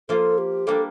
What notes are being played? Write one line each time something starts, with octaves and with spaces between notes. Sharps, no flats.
F3 A#3 F4 A4
G4
G3 A#3 D4 A4